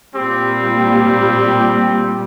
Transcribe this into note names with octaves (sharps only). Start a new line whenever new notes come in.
A#2 G3 C4 G4